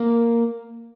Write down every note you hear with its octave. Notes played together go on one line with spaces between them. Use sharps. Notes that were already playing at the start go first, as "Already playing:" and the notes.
Already playing: A#3